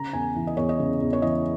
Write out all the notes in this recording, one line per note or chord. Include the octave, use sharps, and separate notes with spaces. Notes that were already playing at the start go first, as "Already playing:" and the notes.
Already playing: C#3 A#5
E2 G#5
E3
D#5
E2 C#5
D#5
C#3
E2
C#5
E3 D#5